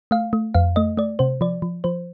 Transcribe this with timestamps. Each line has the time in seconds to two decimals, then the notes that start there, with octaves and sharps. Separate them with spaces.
0.11 A3 F5
0.33 A3
0.54 F2 F5
0.76 A3 D#5
0.97 A3 D5
1.19 C3 C5
1.41 F3 D5
1.62 F3
1.84 F3 C5